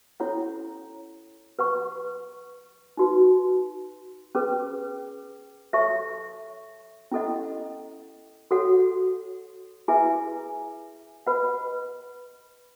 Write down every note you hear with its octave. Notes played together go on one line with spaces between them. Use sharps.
C#4 E4 A4 C#5 F#5
B4 F#5 C#6
D#4 F#4 B4
C#4 G#4 B4
A4 C#5 E5 A5 C#6
C#4 E4 A4 D#5 F#5
F#4 A4 C#5 F#5
E4 G#4 B4 E5 G#5
B4 D#5 F#5 B5